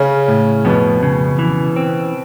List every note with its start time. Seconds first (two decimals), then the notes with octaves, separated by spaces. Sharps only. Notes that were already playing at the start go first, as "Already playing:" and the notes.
Already playing: C#3 C#4
0.28 A2
0.65 F2 B2 B3
1.03 C#3
1.39 E3
1.76 C4